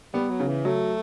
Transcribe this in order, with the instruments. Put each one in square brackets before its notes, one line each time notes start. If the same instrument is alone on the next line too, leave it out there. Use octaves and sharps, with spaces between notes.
[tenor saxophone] G3 [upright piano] B3
[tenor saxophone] F#3
[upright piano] C#3
[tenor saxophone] E3
[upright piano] F#3 [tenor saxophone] A3